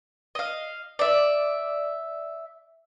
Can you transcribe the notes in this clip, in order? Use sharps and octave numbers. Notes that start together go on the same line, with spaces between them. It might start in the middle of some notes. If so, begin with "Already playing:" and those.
D#5 F5
D5 E5